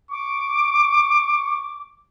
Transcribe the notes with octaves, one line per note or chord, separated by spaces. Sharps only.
C#6 D6